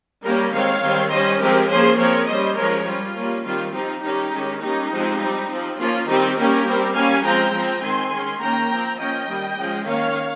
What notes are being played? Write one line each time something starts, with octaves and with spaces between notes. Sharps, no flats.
G3 A#3 C#4 G4 A#4
D#3 G#3 C4 C#5 F5
D#3 G3 C4
G3 C#4 C5 D#5
F3 G#3 C4 G4 A#4
F3 A#3 C#4 G#4 C5
F3 C4 A#4 C#5
G3 C#4 C5 D#5
F3 G#3 C#4 A#4 C#5
G3 C#4 F4
G3 A#3 C#4
D#3 G3 C4 F4
F3 C4 D#4 G4
D#3 G3 C#4 D#4 G4
D#3 G#3 C#4
G3 A#3 C#4 D#4 G4
F3 G#3 C4
G3 C4
F3 C4
F3 A#3 C#4 F4
D#3 G3 C4 D#4 G4
G3 A#3 C#4 G4 A#4
G3 C4
G3 A#3 C#4 F5 G#5
F3 G#3 C4 G5 A#5
F3 C4
D#3 G#3 C4 G#5 C6
D#3 G#3 C#4
D#3 A#3 C#4 G5 A#5
F3 C4
F3 A#3 C#4 D#5 G5
D#3 G3 A#3
F3 G#3 C#4
D#3 A#3 C#4 C#5 F5